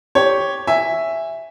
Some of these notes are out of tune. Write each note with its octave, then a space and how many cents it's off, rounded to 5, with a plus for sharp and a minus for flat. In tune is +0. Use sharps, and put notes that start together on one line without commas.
G4 +0 C#5 +0
E5 +0 G#5 -15